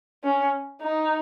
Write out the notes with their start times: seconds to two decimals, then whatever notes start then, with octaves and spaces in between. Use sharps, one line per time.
0.24 C#4
0.82 D#4